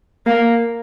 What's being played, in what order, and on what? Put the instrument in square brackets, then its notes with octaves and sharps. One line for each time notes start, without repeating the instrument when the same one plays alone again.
[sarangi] A#3